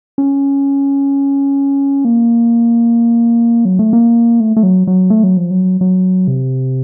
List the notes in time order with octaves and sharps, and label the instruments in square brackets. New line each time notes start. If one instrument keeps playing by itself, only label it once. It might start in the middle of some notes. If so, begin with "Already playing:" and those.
[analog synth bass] C#4
A#3
F#3
A3
A#3
A3
A3
F#3
F#3
A3
F#3
F3
F#3
F#3
C3